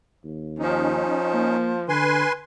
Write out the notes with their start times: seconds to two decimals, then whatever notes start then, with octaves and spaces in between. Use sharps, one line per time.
0.25 D#2
0.59 F3 C#4 D#4
1.34 A#3
1.89 D3 B4 G#5 C6